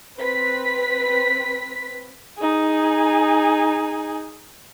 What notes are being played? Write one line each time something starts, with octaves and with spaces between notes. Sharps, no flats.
C4 B4 B6
D#4 G#4